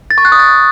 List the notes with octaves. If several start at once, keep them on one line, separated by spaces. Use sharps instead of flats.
A6
C#6
F#6
D#6
A6